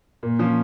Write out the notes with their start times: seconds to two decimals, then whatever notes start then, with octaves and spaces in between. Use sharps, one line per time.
0.23 A#2
0.39 F3 C#4